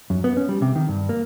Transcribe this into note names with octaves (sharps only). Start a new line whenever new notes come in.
F#2
B3
C#4
G3
C3
D#3
G2
A#3